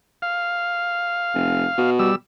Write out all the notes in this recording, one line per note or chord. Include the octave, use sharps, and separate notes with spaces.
F5
F1
B2
G3 E6